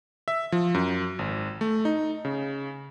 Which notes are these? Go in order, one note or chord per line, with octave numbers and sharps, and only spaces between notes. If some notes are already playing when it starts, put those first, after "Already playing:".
E5
F3
F#2
G#1
A3
D#4
C#3